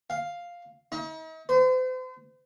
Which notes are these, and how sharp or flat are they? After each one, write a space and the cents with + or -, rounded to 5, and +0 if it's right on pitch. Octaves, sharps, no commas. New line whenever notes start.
F5 +0
D#4 +45
C5 -40